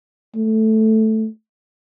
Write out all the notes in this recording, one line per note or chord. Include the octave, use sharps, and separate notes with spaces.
A3